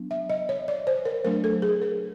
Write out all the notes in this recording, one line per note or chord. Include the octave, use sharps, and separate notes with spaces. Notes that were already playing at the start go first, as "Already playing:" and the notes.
Already playing: F#3 B3 D4
E5
D#5
C#5
D5
C5
A#4
F#3 A3 D4 A#4
A4
G#4
A#4